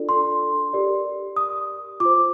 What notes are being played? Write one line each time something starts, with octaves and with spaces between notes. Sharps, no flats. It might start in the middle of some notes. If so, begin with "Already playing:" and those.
Already playing: D4 F4 A4 D5
C6
G4 A#4 D5
D#6
F4 C5 D6